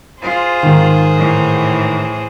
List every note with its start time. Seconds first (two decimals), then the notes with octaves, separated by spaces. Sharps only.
0.22 F4 G#4 C5
0.63 G#2 D#3
1.16 A2 E3